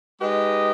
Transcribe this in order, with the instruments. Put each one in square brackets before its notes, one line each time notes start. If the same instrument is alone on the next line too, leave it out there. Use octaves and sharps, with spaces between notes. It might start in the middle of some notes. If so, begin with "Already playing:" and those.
[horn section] G#3 D#4 G4 B4 D#5